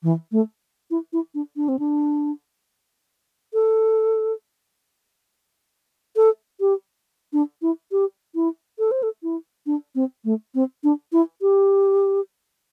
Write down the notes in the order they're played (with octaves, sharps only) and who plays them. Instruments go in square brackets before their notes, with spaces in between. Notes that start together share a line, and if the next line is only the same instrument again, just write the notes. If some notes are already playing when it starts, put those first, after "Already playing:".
[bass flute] E3
A3
E4
E4
D4
D4
C4
D4
A4
A4
G4
D4
E4
G4
E4
A4
C5
A4
E4
D4
C4
A3
C4
D4
E4
G4